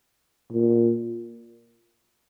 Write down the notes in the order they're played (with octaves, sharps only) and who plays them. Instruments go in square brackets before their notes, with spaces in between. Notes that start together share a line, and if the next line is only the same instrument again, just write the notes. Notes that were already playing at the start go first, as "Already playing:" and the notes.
[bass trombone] A#2